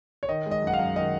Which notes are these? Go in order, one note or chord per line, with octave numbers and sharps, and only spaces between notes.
C#5
D#3 D#5
G#3
D#5
F#2
F#5
F5
F#2
D#3 D#5